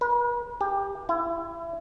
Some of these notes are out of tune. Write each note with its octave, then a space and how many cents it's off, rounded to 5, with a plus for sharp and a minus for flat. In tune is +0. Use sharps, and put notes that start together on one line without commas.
B4 -45
G4 +15
E4 +25